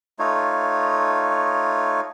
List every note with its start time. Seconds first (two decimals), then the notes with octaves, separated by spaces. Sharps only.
0.19 A3 D#4 F4 C#5